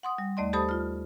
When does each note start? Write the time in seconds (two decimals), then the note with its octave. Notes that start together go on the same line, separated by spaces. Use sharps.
0.03 F#5 C6 D#6
0.18 G3
0.37 D#2 A3 D5 D#5 C6
0.53 G4 A4 C5 A5 B5 D#6
0.69 F4 F6